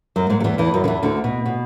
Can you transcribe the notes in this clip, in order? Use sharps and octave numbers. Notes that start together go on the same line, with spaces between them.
F#2 F#3
G#2 G#3
F#3
E2 E3
E2 E3
F#2 F#3
D3
E2 E3
D2 D3
B2
B2